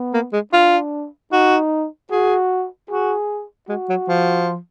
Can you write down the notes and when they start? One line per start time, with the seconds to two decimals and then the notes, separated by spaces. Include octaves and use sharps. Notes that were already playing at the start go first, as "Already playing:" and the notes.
Already playing: B3
0.14 A#3
0.33 G#3
0.53 D4 F4
1.32 D#4 F#4
2.11 F#4 G#4
2.90 F#4 G#4
3.69 G#3 F#4
3.89 F#3
4.09 F3